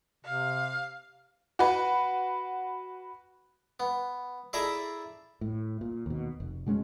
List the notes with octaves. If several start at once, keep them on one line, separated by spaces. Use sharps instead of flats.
C3 F5
F#4 B4
B3
E4 G#4 A4 D5 E5 A#5
A2
A#2
D#2 B2
F1
B2 G#3 A3 C#4